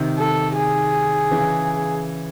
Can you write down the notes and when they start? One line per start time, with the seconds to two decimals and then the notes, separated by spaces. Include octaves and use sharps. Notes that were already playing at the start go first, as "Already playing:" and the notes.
Already playing: C3 D#3
0.19 A4
0.57 G#4
1.31 C#3 E3